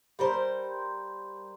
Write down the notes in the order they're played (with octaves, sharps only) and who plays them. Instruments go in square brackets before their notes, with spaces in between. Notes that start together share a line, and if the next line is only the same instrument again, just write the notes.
[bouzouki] G3 A#4 C5